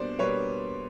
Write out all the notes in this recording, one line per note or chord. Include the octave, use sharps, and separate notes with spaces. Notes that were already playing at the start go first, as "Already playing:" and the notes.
Already playing: B2 G3 A#3 D4 C5 D5
B2 G3 A#3 D4 B4 C#5